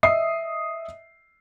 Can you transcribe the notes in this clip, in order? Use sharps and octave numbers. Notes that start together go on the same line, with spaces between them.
D#5 E5 D#6 C7